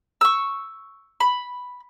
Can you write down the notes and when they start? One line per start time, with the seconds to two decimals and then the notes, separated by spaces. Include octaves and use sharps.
0.21 C#6 E6
1.20 B5